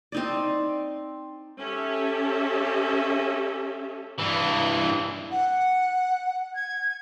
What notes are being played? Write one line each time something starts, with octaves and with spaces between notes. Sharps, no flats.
C4 D#4 D5
C#4 G4 A4 E5
G2 E3
F#5
G#6